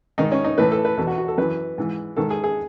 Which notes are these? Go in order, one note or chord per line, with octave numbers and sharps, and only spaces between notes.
G#2 D#3 D#4
C#4
D#4
A2 E3 B4
A4
B4
E2 B2 A4
F#4
F#4
A4
F#2 E3 B4
G#2 E3
G#2 D#3 A4
G#4
G#4